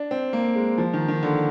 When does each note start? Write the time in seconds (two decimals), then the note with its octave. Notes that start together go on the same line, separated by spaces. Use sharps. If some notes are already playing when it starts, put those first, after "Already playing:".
Already playing: D4
0.11 C4
0.33 A#3
0.55 G#3
0.78 F3
0.93 D#3
1.08 D#3
1.23 D3